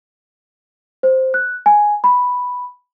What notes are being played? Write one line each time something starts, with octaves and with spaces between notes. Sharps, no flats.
C5
F#6
G#5
B5